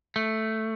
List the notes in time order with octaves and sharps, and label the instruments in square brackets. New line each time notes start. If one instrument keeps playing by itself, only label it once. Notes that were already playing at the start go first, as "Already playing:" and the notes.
[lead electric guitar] A3